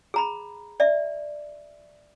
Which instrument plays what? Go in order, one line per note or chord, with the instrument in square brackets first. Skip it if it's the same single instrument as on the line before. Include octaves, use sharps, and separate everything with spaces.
[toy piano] G#4 A#5 B5
D5 E5